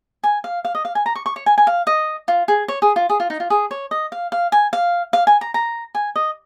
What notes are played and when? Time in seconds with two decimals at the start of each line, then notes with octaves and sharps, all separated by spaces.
0.24 G#5
0.44 F5
0.65 F5
0.75 D#5
0.85 F5
0.95 G#5
1.06 A#5
1.15 C#6
1.26 C#6
1.36 C#5
1.46 G#5
1.58 G#5
1.67 F5
1.87 D#5
2.28 F4
2.48 G#4
2.68 C#5
2.82 G#4
2.96 F4
3.10 G#4
3.20 F4
3.30 D#4
3.40 F4
3.50 G#4
3.71 C#5
3.91 D#5
4.12 F5
4.32 F5
4.52 G#5
4.73 F5
5.13 F5
5.27 G#5
5.41 A#5
5.54 A#5
5.95 G#5
6.16 D#5